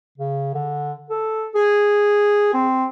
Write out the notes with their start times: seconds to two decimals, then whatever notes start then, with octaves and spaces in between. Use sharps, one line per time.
0.18 C#3
0.54 D3
1.10 A4
1.55 G#4
2.54 C4